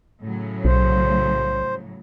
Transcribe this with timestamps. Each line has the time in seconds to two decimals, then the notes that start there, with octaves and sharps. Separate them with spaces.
0.20 A2 C#3 F#3
0.65 B1 C5